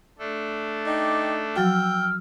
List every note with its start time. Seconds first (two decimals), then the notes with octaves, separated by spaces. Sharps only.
0.19 A3 D4 A4
0.87 D#4 G5 D6
1.56 F3 F#3 F#4 G5 E6 F6